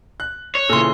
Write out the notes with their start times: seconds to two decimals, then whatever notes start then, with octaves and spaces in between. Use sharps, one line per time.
0.20 F#6
0.55 C#5
0.69 A#2 C#3 E3 A4 C6